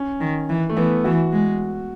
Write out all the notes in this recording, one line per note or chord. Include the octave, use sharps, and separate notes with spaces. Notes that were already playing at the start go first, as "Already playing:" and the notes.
Already playing: C#4
D#3
E3
A3
E3 B3
E3 F#4
G#3